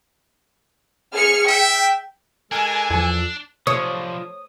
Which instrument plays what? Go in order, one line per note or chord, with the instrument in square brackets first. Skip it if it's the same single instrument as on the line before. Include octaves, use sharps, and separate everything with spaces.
[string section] G#4 F6 C#7
[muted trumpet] E5 [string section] G5
[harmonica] G#3 A4 A#4 [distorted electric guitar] D4 [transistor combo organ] G#5
[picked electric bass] E2 F3 [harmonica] A4
[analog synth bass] C3 [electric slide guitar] F3 D4 [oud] C#5 [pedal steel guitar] D#6